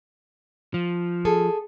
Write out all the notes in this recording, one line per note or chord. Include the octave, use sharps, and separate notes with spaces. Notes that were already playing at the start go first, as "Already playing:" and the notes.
F3
G#4 A4